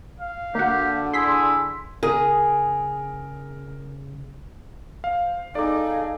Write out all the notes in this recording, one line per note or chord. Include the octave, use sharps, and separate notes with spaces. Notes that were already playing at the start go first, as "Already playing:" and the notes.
F5
D3 A#3 F#4 G4
E4 G#4 C6 B6
C#3 G#4 A#4 D#6
C5 F5
D#4 G#4 A4 D5 F5 D6